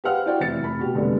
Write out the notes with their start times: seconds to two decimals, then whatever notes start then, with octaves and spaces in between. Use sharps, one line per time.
0.04 G4 B4 C5 F5 F#5 F6
0.26 E4 F#4 C5 D5 F#5 G5
0.40 F1 E3 E4 A6 C#7
0.62 F1 B5
0.79 B2 F#4 G4
0.95 F1 D3 G3 G#3 B3